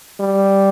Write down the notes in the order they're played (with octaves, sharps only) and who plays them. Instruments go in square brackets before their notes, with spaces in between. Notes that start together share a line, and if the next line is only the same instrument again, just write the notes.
[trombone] G3